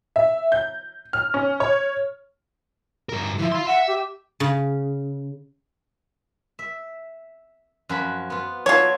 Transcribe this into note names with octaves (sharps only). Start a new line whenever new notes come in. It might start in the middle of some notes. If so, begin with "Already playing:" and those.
E5
G6
F6
C#4
C#5
G2 A#4
E3 F3 E4
F5 C6
E5 F#5
G4
C#3
E5
F#2 F3 B5
B3 F4
F#3 F4 A4 C5 C#5